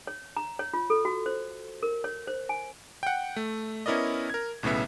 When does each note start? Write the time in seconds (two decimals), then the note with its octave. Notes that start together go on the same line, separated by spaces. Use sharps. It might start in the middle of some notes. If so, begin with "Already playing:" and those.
0.07 C#5
0.37 A#5
0.59 C#5
0.74 F4
0.90 A4
1.05 F#4
1.26 C5
1.83 A#4
2.04 C#5
2.27 C5
2.49 G#5
3.03 F#5 G5
3.36 A3
3.86 B3 C#4 E4 A#4 D5 D#5
4.30 A#4 G#6
4.63 B1 A2 C#3 B3 E5